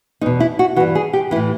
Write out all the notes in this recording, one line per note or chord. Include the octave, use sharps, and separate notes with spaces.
E2 B2 D#4
E4
F#4
G2 E3 F#4
G#4
G4
A2 E3 E4